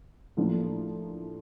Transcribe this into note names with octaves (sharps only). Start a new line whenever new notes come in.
A2 F3 A#3 D4